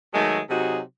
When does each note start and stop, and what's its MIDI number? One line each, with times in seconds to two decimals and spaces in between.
0.14 0.40 51
0.14 0.40 54
0.14 0.40 56
0.14 0.40 57
0.50 0.80 48
0.50 0.80 54
0.50 0.80 63
0.50 0.80 66
0.50 0.80 68